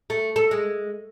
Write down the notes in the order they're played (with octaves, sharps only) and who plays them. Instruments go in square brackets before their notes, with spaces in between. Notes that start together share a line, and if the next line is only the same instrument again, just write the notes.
[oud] A3
A4
G#3